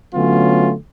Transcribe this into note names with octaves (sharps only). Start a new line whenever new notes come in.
D3 F#3 A3 B3 C#4 F4